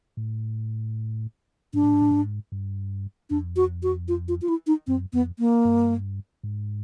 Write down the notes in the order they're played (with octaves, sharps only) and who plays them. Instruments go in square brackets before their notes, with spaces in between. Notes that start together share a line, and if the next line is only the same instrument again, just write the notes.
[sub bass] A2
[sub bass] G#2 [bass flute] D4
[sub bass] A2
G#2
A2
G#2
G2
[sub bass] F2 [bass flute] D4
[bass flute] F#4
F#4
F4
F4
F4
E4
D#4
[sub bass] F#2 [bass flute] C4
[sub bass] F2 [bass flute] B3
[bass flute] A#3
[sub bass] G2
G#2